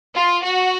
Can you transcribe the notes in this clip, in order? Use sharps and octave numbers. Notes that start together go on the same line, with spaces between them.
F4
F#4